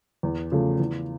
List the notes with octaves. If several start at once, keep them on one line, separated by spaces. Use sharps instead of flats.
E2
C#3 F3 A3
E2